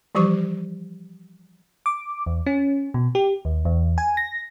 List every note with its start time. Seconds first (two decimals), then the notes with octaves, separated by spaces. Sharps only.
0.15 E3 F3 G3 G4 C#6
1.86 D6
2.26 E2
2.46 C#4
2.94 B2
3.15 G4
3.45 D#2
3.65 E2
3.98 G#5
4.17 A#6